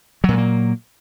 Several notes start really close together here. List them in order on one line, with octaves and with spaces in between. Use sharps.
F#3 A#2 A3 A#3